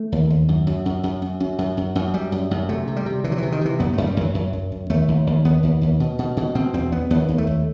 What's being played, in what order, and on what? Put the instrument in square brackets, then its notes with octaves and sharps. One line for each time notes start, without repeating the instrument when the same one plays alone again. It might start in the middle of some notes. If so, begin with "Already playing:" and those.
Already playing: [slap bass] A3
D#2
D#2
F#2
F#2
F#2
F#2
F#2
F#2
F#2
F#2
F#2
F#2 G3
F#2
F#2
C3 A3
C3
G3
C3
C3 E3
F#3
C3 E3
D#3
C3 E3
F#2 B3
F#2 A3
G3
F#2 E3 F#3
F#2
F#2
F#2
D#2 A3
D#2
D#2
D#2 B3
D#2
D#2
B2
B2
B2
B2 C4
E2 C4
E2 B3
D#2 B3
D#2
A3
D#2